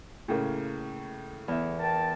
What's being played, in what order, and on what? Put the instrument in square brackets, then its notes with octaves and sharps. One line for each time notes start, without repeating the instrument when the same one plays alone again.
[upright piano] A2 C#3 A#3
[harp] E2 E5
[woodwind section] A#4 G5 A5